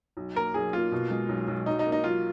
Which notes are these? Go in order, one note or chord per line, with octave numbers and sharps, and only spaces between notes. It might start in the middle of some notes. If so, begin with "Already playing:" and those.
B1
A#3 A#4
B1 G#4
A#3 F4
B2
G#3
B1
B1
F#3 D#4
D#4
A#3
D#4
F#3 F4